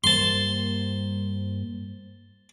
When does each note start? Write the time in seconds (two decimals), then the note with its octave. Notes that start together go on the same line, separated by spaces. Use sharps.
0.04 G2 A#3 C5 A5 C6